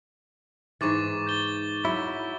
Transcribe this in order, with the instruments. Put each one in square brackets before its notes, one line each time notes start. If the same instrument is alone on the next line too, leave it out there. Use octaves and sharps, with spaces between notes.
[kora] G#2 E3 [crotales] C#6 D6 A6
[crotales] G6 A6 G7
[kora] F#3 [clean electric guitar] E4